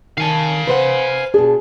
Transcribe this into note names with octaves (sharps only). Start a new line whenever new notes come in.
D#3 F5 G#5 A5
B4 C5 F#5
B2 D4 G#4